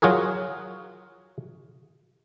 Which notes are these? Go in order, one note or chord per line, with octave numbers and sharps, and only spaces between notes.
F#3 F4 F#4 G#4 A#4